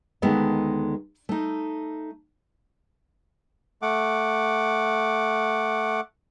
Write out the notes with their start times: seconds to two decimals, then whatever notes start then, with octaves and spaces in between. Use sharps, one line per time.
0.22 D2 D#3 G#3 A3 B3 A5
1.29 A3 D#4
3.82 A3 F#5 D6